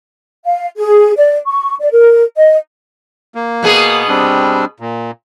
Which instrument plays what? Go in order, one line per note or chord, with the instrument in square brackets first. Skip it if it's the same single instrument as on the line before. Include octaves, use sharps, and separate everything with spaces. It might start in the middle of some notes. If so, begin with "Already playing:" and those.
[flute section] F5
G#4
D5
C#6
D5
A#4
D#5
[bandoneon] A#3
[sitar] B2 B3 G#4
[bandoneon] G3 C4 D4
A#2